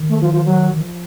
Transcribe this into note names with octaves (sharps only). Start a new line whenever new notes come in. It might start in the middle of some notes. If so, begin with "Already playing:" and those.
Already playing: D#3
A3
F3
F3
F#3
D#3
F3